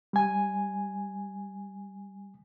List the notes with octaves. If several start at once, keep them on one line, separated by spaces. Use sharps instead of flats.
G3 G#5